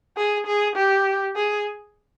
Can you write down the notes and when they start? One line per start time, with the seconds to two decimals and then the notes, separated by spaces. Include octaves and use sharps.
0.17 G#4
0.47 G#4
0.76 G4
1.36 G#4